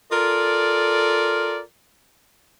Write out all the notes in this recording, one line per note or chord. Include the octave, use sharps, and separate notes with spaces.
F4 A4 A#4 D5